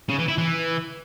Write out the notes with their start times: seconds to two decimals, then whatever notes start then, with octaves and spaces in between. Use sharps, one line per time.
0.09 C#3
0.19 E3
0.28 E4
0.38 E3